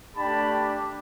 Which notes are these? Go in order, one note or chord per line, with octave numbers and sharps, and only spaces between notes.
A3 D4 G4 A5 B5